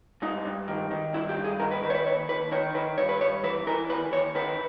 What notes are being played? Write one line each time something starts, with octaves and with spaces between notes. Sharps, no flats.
G2 D#4
G2
D#3
D#3
G2 E4
G4
G2
G#4
D#3 A#4
B4
D#3 B4
C#5
B4
D#2 C#5
D#2 B4
D#3 C#5
D#3 B4
G2 C#5
B4
G2 C#5
E3 B4
E3 A#4
D#2 B4
D#2 C#5
D#3 B4